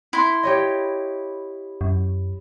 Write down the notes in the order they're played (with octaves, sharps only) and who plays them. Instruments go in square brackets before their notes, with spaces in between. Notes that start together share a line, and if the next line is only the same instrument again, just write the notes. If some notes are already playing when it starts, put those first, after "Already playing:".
[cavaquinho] E4 C6
[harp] G4 C#5 D#5
[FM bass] F#2